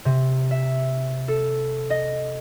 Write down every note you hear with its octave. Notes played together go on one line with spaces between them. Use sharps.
C3
E5
A4
D#5